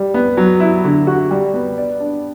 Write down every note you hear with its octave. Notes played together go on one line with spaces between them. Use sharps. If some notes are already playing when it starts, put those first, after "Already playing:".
Already playing: G3
B3
F#3
E4
D3
F#4
G3
B3
D5
D4